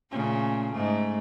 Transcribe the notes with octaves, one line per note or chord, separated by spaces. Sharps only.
A#2 C#3 A3
G#2 A3